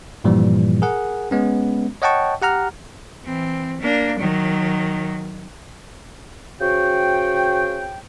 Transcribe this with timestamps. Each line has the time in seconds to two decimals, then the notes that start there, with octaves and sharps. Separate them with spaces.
0.24 G2 A#2 E3 F3 G3
0.82 G#4 A#4 F#5
1.31 G#3 B3 C#4
2.02 C#5 D#5 F#5 G5 A5 C#6
2.42 G4 F#5 A#5 F6
3.24 E3 C4
3.81 A#3 D4
4.19 D#3 F#3
6.61 C#3 F#4 C5 G5